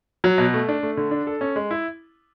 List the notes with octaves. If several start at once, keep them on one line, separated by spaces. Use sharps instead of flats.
F#3
B2
A3
D4
A3
D3
D4
A4
C#4
G#3
E4